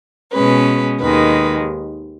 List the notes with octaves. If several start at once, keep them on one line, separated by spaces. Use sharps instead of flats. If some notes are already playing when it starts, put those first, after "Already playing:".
B2 G#3 C#4 B4
D#2 D#3 G#3 B4